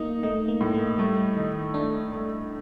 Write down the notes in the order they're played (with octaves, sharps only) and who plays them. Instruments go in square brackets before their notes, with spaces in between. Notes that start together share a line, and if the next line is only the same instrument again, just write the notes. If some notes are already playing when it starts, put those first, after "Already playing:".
Already playing: [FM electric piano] A#3 [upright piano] D#4
[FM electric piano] A3 [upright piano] D#4
[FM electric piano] A#3
[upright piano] A2
[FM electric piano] A#3
[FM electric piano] G3 [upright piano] A3
[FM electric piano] D#3 [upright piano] D#4
[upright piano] A3 [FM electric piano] D4
[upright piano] A3